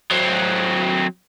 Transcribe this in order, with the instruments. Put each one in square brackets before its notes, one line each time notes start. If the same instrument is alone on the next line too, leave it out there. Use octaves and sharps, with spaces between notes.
[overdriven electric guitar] F#3 C4